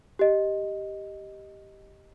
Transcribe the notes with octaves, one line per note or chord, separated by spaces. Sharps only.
G4 D#5